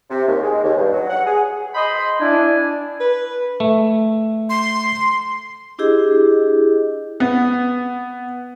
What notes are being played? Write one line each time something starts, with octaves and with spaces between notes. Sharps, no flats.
C3
D#2
G#3
D#2
G2
F#3
F#5
G#4
C5 D#5 B5
D4 E4 G#5
B4
A3
C6
D4 E4 G4 G#4 D#5
B3